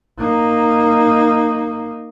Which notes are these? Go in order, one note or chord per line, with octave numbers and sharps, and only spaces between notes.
A#3 D#4